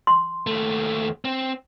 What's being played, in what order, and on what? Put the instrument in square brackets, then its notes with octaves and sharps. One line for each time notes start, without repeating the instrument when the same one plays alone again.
[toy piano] C6
[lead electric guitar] D#2 A3
C4